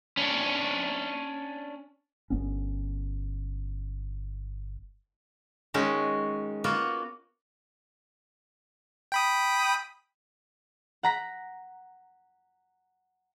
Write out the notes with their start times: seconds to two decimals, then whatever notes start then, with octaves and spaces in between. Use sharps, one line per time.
0.17 C#4 D4
2.30 G1 B3 C#4
5.74 D#3 G#3 C#4 D#4 F#4
6.64 A#3 B3 F4 F#4
9.12 G5 B5 D#6
11.03 F#5 A#5 B6